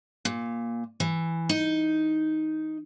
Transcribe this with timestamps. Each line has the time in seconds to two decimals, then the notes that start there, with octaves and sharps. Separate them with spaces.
0.25 A#2
1.00 E3
1.49 D#4